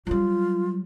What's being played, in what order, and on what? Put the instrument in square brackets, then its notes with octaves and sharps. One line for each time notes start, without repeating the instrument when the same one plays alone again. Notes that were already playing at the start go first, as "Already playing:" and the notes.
[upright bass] F#3 G3 [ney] F4